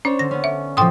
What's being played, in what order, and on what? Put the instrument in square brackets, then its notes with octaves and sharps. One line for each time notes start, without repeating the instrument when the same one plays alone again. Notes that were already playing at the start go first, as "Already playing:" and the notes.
[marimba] C#4 [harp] D4 C5 C#5
[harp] D3 [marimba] A#6
[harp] B3 C#4
[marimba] E5
[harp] A2 C3 F3 [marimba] G5 C6 D#6